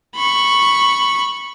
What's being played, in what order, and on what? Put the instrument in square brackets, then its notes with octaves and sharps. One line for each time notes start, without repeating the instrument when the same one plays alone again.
[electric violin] B5 C#6